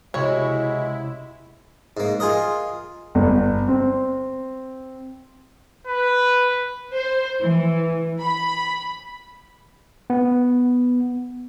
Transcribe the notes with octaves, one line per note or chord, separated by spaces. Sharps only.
C#2 C3 G#3 E4 F#4 C#5 B5
G#2 A#3
F4 G#4 A#4 D#5
G1
C4
B4
C5
E3
B5
B3